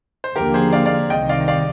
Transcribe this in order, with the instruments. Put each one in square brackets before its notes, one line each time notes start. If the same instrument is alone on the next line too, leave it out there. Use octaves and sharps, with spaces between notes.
[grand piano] C5
[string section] D#2 D3 F3 A#3 [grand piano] G4 A#4
[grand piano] G#4 C5
D5 F5
D5 F5
[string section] C2 C3 D#3 [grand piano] D#5 G5
[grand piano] D5 F5
D5 F5